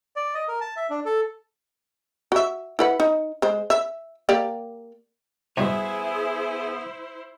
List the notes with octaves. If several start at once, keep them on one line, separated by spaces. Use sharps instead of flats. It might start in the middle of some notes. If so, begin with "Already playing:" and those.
D5
D#5
A#4
A5
E5
D4
A4
F#4 E5
E4 B4 F#5
D#4
G#3 C5
E5
A#3 G4 D5
E2 G2 B2 B3 E4 G#4 C5 E5